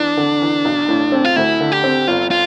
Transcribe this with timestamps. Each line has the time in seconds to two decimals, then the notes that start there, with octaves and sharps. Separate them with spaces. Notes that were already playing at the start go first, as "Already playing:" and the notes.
Already playing: E2 D4
0.17 D3
0.42 E2
0.65 B1
0.88 A2
1.12 C4
1.25 F4
1.36 D2 E4
1.60 D3
1.72 G4
1.84 C4
2.07 G1 F4
2.31 F4